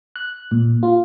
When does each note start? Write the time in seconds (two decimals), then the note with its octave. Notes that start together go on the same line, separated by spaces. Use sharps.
0.16 F#6
0.51 A#2
0.83 F4